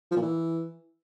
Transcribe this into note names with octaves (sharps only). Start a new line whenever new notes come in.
F3
A#2
E3